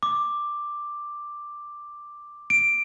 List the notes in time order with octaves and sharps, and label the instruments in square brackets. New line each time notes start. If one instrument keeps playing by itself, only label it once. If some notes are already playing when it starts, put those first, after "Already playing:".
[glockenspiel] D6
D7